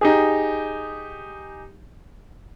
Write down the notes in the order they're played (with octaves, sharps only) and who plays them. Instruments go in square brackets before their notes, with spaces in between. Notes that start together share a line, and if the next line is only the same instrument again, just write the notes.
[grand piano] D#4 G4 G#4